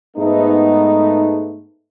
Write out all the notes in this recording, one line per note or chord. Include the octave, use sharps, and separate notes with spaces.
G#2 A3 B3 D#4